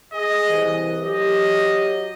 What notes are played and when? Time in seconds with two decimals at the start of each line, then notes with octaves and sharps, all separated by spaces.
0.13 G#4 D#5
0.48 C2 E3
1.03 F#3 G4 D#5